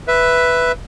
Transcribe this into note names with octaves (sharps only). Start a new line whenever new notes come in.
B4 E5